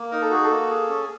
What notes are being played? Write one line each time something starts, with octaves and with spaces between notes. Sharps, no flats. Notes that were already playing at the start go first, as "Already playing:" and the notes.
Already playing: A#3
D#4 A#4
A4
F#4 G#4
A4
A#3
G#4
C#4